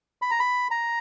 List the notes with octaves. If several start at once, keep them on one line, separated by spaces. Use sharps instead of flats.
B5
A#5
B5
A#5